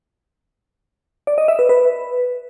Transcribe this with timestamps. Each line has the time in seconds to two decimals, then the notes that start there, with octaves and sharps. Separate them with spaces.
1.27 D5
1.38 D#5
1.48 E5
1.59 B4
1.69 B4